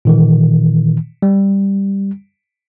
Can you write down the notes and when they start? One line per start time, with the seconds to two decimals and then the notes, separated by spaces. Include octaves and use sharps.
0.05 A#2 D#3 E3
1.22 G3